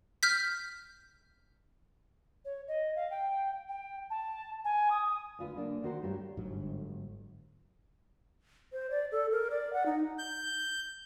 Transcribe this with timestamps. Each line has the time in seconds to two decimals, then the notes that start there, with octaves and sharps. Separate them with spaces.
0.23 F6 G6 B6
2.44 C#5
2.67 D#5
2.95 F5
3.10 G5
3.68 G5
4.09 A5
4.64 G#5
4.90 D#6
5.39 D2 F4 B4
5.57 D3 A#3 D4
5.83 D2 D#3 F#4 A#4 C5
6.02 G2 A3 G4 C#5
6.37 G1 G#2 F#3
8.73 C5
8.91 D5
9.12 A4
9.32 A#4
9.51 D5
9.73 F#5
9.86 D#4
10.18 G6